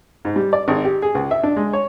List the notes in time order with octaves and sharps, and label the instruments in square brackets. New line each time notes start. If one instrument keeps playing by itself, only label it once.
[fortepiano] G#2
G3
D5
G#1
G4
G#4
C#2
E5
D4
G#3
C#5